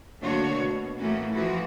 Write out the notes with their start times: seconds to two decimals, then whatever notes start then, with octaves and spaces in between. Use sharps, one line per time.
0.22 D3 A3 A#3 D4 F#4 C#5
0.55 B2
0.98 A2 E3 A3 A#3 C#4 F#4
1.33 E3 F3 A3 E4 F#4